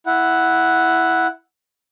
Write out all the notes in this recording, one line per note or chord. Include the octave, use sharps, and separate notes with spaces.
E4 F#5